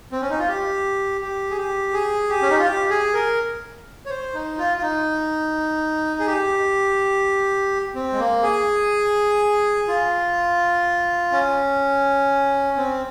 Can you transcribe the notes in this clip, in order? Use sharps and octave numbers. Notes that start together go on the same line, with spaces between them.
C4
C#4
D#4
F4
G4
G4
G#4
G4
G#4
G4
C#4
D#4
F4
G4
G#4
A#4
C#5
C5
D#4
F4
F4
D#4
G#4
G4
C4
G#3
A#3
G#4
F4
C#4
C4